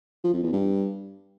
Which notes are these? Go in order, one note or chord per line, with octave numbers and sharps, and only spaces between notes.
F3
F2
E2
G2